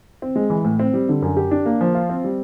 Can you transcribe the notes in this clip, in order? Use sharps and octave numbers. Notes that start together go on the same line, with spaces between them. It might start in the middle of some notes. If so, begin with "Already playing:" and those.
C4
G#3
E3
A2
C4
G3
D3
F#2
G4
D4
A#3
F3
F4
C4
G3